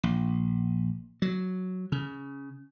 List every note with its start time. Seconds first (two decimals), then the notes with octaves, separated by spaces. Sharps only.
0.03 A#1
1.22 F#3
1.92 C#3